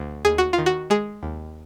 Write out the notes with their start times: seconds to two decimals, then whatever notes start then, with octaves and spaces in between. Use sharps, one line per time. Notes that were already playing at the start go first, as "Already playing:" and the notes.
Already playing: D2
0.25 D#2 G#4
0.38 F#4
0.53 F4
0.58 D#3
0.66 F#4
0.90 G#3 G#4
1.23 D#2